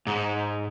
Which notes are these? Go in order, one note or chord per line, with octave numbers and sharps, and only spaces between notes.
G#2